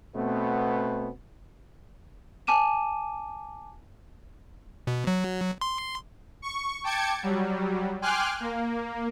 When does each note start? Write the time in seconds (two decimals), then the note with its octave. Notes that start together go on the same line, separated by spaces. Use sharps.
0.15 B2 A3 B3 C4
2.47 G#5 A5 D6 D#7 E7
4.87 B2
5.07 F#3
5.61 C6
6.42 C#6
6.84 G5 A5 D6 G#6 C#7
7.22 F#3 G3
8.02 G5 G#5 C6 D6 F6 F#6
8.40 A#3